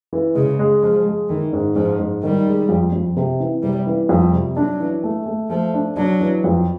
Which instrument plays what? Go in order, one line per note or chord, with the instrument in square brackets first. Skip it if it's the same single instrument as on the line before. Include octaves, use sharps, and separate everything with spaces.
[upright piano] E3
[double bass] C#3 [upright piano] G#3
[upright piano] G#3
[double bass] F3 [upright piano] G#3
[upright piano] G#3
[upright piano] D#3 [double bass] E3
[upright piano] G#2
[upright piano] G#2 [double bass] F3
[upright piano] G#2
[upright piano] D#3 [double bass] G3
[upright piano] G#3
F2
F2
C3
E3
[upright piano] C3 [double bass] G3
[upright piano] E3
[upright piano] F2 [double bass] G3
[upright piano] C3
[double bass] F#3 [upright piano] D4
[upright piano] E3
A3
A3
[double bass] F3 [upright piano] A3
[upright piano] D4
[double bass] F#3 [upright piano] D4
[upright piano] E3
F2